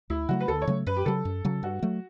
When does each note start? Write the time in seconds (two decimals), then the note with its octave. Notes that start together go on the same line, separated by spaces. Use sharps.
0.10 D2 E4
0.29 C#3 F#3 A3 F#4
0.41 B4
0.48 D2 A4
0.62 C#5
0.67 C#3 F#3 A3
0.86 F#2 B4
0.96 G4
1.06 C#3 F#3 A4
1.25 F#2
1.45 C#3 F#3
1.63 G2 F#4
1.83 F#3 A3